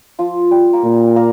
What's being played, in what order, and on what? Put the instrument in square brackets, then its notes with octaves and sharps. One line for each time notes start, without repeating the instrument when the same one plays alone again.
[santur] F3 F4
G3 G4
A#3 A#4
[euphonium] A#2
[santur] A#3 A#4